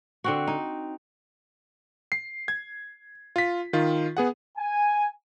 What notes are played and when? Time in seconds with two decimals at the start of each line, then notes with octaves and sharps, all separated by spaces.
0.24 D3 C4 F#4
0.47 D#4
2.12 C7
2.48 G#6
3.36 F4 B6
3.73 D#3 F4
4.17 B3 G#4 F#5
4.58 G#5